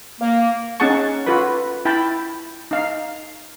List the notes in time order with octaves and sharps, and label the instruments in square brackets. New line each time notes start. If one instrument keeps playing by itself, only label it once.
[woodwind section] A#3
[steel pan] C#4 D#4 G#4 F#5 A5 C#6
F4 F#4 A4 B4 B5
E4 G5 A5 B5
D#4 F5